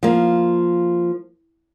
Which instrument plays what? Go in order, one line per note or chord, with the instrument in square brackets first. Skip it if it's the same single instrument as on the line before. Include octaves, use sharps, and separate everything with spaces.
[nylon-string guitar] F3 A#3